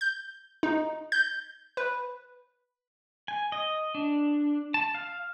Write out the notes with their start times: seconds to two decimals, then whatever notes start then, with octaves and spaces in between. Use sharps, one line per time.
0.01 G6
0.63 D#4
1.12 G6
1.77 B4
3.28 G#5
3.52 D#5
3.95 D4
4.74 A5
4.95 F5